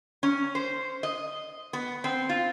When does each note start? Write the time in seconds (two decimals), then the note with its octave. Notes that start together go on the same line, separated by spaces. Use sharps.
0.23 C#4
0.55 C5
1.03 D#5
1.73 B3
2.04 C4
2.29 F4